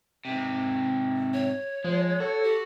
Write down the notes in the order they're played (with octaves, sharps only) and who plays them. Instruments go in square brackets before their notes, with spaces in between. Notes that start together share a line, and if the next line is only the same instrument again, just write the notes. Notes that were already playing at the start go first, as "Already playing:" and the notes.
[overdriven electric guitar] G#2 C3
[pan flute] C#5
[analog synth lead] F3 [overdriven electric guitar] G#3
[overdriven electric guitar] F#4 [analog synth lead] A4
[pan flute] G4